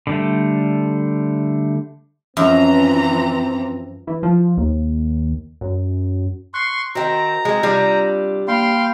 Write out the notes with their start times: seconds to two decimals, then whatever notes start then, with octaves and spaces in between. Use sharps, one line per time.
0.07 D3 G3 A3
2.37 F#2 E3 F3 C4 A#5
4.07 E3
4.23 F3
4.57 D#2
5.61 F#2
6.54 C6 C#6 F#6 C7
6.95 D#3 C4 F#4 D#5 G5 A#5
7.45 G#3 A#3 C4
7.63 C3 G3 D4 F4
8.48 A#3 F5 G5 B5 C6 C7